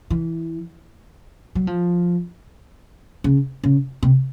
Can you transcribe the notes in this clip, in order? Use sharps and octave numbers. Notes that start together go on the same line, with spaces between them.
E3
F#3
F3
C#3
C#3
C3